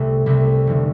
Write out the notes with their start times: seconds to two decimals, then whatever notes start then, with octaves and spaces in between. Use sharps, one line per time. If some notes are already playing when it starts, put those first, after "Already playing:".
Already playing: C2 C3 A3 C4
0.26 C2 C3 A3 C4
0.67 F1 D3